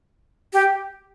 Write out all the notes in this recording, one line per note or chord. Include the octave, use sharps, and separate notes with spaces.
G4